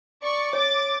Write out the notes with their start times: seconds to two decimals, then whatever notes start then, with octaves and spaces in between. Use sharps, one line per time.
0.21 D5 C#6
0.53 C#5 D6 A6